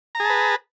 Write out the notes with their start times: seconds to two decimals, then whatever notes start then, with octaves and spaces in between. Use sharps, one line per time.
0.15 A#5
0.20 G#4
0.25 A5
0.30 B4